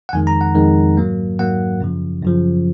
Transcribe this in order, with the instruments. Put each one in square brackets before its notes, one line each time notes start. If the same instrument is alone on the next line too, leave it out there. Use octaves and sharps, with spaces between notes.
[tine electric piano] F#5
F2 D#3 G#3 G#5
A#5
F#5
F2 D#3 G#3
G#2 F#3 A#3
G#2 F#3 A#3 F#5
F#2 C#3 F3
F#2 C#3 F3